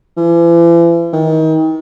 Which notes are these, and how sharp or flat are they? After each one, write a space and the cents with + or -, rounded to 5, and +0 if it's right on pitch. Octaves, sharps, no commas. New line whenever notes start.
E3 +40
D#3 +30